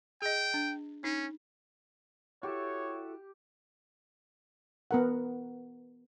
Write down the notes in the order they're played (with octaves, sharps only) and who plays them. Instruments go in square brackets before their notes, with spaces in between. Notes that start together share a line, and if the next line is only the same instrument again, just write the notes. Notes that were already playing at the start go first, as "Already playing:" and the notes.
[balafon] G#4 D#5 [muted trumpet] G5
[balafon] D4
[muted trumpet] C#4 [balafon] D#4
[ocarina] E4 [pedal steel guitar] F#4 A4 E5 [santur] G4 [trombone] C#5
[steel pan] B3 A#4 F#5